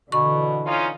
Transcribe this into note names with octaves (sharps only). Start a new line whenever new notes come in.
B2 D3 E3 C#6
C#4 D#4 F4